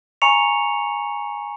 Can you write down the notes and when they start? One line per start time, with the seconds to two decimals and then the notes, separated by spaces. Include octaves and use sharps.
0.22 G#5 A#5 C#6 C#7 F7